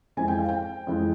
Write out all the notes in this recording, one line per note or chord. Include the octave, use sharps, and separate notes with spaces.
F2 E3 G#3 C4 G#5
G5
F5
G5
F2 E3 G#3 C4